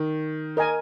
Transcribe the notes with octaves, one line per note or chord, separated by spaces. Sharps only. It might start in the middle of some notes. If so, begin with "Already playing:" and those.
Already playing: D#3
A#4 D#5 G#5